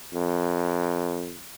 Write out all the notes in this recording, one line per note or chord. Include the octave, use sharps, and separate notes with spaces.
F2